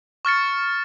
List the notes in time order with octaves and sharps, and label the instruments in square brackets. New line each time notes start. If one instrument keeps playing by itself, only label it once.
[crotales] C#6 F6 A6 C#7